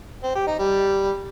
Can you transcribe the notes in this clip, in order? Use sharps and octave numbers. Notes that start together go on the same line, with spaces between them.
C4
G4
D#4
G3